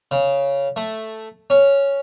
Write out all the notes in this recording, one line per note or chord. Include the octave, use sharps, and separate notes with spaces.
C#3
A3
C#4